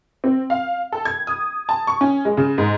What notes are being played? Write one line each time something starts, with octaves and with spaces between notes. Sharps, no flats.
C4
F5
A4
G#6
D#6
A5
C#6
C#4
G#3
C#3
G#2